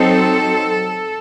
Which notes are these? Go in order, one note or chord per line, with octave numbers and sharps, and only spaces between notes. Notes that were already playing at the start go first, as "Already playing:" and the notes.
Already playing: F#3 C4 D#4 A4